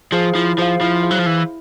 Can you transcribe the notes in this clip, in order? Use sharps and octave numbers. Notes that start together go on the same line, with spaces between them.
F3 G#4 C5 F5
F3 E4
F3 G#4 C5 F5
F3 E4
G#4 C5 F5
F#3
F3
E3 E4